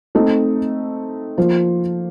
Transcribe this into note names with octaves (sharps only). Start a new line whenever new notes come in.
A3 C4 D#4 A4 D#5
F3 A#3 F4 C5